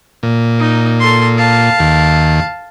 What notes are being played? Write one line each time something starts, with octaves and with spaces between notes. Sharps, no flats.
A#2
D#4
A4 C6
F5 A5
D#2